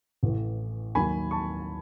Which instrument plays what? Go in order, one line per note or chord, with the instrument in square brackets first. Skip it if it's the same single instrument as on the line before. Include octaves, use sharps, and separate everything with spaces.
[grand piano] A1 A2 E3
D#2 D#3 F#3 G#5 B5
A5 C#6